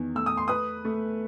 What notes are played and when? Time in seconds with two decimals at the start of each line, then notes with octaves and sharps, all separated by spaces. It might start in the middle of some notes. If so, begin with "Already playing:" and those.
Already playing: E2 D#3
0.15 A3 E6
0.26 D#6
0.37 C6
0.48 B4 D#6
0.85 A3